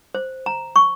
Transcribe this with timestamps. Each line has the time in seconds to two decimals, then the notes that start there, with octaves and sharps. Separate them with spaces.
0.15 C5
0.46 A#5
0.76 C#6